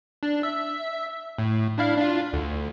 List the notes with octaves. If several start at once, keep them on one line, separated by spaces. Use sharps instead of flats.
D4
E5
A2
D4 E4 F5
D4 F4
D2